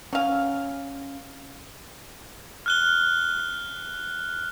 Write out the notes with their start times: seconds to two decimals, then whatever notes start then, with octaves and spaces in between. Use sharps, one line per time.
0.13 F#3 C#4 F5 G#5
2.66 F6 F#6 G7